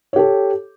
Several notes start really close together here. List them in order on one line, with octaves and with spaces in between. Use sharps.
C#5 G4 A4